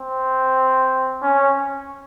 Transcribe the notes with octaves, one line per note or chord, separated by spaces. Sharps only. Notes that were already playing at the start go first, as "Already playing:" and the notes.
Already playing: C4
C#4